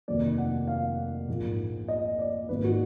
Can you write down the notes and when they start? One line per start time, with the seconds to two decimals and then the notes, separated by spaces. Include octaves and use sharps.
0.08 F1 D#2 D#3 F#3 A#3 D5
0.38 F#5
0.67 F5
1.28 A#1 G#2 F3 A#3
1.88 D#5
2.19 D5
2.49 G#1 G#2 D#3 A#3 B4
2.64 F#4